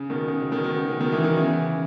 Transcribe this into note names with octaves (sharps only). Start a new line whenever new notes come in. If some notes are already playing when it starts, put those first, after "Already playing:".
Already playing: C#3
B2 D#3
C#3
C#3
B2 D#3
B2 D#3
C#3
C#3
B2 D#3
C#3 E3
B2 D#3
C#3 E3